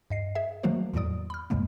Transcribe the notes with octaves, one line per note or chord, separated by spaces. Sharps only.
G2 D#5 C7
G#4 E5
D#3 F#3 A3 A#3 F#4 C5
E2 A2 D#3 F#3 D5 D#6
B5 F6
G#1 E2 G#2 C#3 G#3 A#3